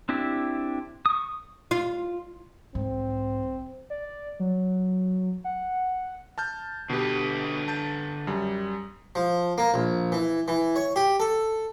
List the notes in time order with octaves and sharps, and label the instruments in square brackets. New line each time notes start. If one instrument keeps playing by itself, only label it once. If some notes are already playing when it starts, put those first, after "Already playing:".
[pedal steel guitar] C4 D4 E4 G4
C#6 D#6
[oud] F4
[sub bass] B1 [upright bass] G#2 [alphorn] C4
[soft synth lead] D5
F#3
F#5
[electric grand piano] A5 F6 G6
[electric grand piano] B2 G4 [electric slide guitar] D3 B4
[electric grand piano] A5 G6 A6
F#2 G3
[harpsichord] F3
A#3
A#1
E3
E3
C#5
G4
A4